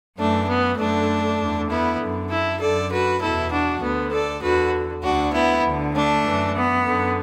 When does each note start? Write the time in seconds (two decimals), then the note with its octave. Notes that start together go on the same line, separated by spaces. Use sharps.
0.18 F#2 E3 A3 D4
0.49 B3
0.79 F#2 D3 A3 D4
1.40 E2 D3
1.70 B3 E4
2.00 F#2 D3
2.31 E4 A4
2.61 F#2 D3 A4 D5
2.91 F#4 B4
3.22 E2 B2 E4 A4
3.52 D4 F#4
3.82 D2 D3 B3
4.13 A4 D5
4.43 E2 D3 F#4 B4
5.03 D2 D3 D4 F#4
5.34 B3 E4
5.64 D2 D3
5.94 A3 D4
6.25 F#2 E3
6.55 B3
6.86 F#2 D3